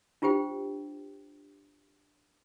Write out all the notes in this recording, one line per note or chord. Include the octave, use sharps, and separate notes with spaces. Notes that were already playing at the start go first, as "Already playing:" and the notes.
D4 F4 G4 C5 G5